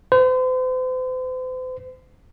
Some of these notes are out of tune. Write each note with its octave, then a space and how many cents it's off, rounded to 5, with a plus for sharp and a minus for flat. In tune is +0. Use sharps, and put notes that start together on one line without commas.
C5 -40